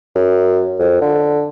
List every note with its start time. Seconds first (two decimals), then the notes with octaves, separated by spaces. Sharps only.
0.16 F#2
0.79 F2
1.01 D3